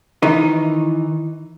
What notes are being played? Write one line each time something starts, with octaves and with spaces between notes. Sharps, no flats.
D#3 E3 D#4